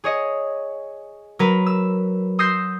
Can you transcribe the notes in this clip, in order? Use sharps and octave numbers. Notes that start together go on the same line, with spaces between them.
G#4 C#5 D#5
F#3 A#4 B4
E6
C6 D#6 E6 G6 A#6 C7